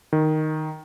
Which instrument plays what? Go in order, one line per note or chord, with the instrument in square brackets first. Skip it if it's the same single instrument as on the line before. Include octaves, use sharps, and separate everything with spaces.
[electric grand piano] D#3